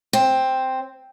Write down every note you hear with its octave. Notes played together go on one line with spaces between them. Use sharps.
C4